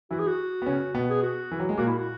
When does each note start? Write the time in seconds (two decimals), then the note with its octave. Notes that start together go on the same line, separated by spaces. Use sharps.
0.11 E3 E4 F#4
0.19 G#4
0.27 F#4
0.62 B3
0.66 C#3 C#4
0.94 B2 B3
1.10 G#4
1.22 F#4
1.51 E3
1.60 F#3
1.69 G#3
1.77 A#2 A#3 F#4
1.88 E4
1.98 F#4